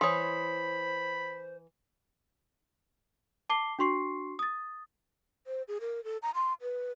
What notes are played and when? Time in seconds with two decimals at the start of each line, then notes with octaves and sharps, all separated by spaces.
0.01 E3 C5 C#5 B5 C6 D#6
3.50 A5 D6 C7 G7
3.79 D4 F#4 C6 C#6 C7
4.39 D#6 A6
5.47 C5
5.68 G#4
5.81 A#4
6.04 A4
6.22 A#5
6.35 C6
6.62 B4